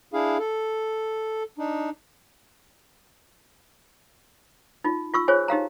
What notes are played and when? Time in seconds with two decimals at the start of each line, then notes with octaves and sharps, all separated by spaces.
0.14 D4 E4 G#4 F5
0.39 A4
1.58 D4 D#4
4.84 D#4 F4
5.14 F4 C#6 E6
5.28 F4 G#4 C5 C#5 G#5
5.48 D#4 G4 F5 A#5